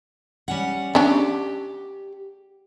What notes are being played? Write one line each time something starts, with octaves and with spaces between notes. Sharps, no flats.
G3 C#4 F#5
C#4 D4 G4